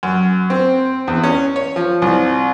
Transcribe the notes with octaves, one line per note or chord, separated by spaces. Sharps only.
F#2
C4
E2
C#4
C#5
F3
C2